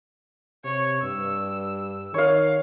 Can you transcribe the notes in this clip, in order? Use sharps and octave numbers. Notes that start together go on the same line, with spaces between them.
C3 C#5
G2 E6
D#3 C#5 F5